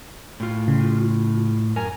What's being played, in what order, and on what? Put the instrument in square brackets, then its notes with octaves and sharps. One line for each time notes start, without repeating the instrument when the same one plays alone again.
[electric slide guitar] A2 F4
[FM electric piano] C#3
[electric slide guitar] F#2 A#4 G#5